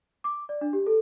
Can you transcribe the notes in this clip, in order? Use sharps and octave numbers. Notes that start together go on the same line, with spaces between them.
D6
D5
D4
G4
A4